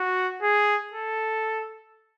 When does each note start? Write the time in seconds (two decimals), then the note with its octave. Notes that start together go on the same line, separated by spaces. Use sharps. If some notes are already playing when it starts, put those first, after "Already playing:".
Already playing: F#4
0.42 G#4
0.93 A4